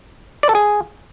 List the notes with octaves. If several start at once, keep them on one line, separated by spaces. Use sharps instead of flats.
D5
A4
G#4